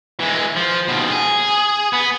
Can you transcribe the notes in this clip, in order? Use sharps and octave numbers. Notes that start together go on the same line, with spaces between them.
E3 G#3
F3
D#2 B2
G#4
B3